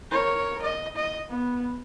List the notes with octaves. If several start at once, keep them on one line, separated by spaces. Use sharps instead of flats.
A#4 C#5
D#5
D#5
B3